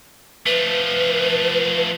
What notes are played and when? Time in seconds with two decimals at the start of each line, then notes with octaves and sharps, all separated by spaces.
0.46 F3 A3 B4